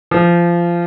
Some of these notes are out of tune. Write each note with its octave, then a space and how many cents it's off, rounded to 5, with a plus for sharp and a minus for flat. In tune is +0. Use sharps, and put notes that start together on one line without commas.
F3 -20